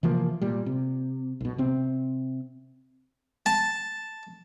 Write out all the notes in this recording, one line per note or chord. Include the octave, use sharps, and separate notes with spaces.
C3 E3 F3 A#3
A#2 G3
C3
B1 B2
C3 C4
A5